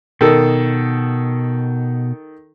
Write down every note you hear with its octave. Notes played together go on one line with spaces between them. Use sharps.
B2 D#3 A4